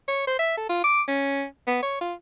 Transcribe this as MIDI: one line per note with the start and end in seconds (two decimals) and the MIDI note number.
0.08 0.23 73
0.27 0.35 72
0.39 0.57 76
0.57 0.68 69
0.70 0.82 65
0.84 1.02 86
1.08 1.44 61
1.67 1.82 59
1.83 2.00 73
2.01 2.14 65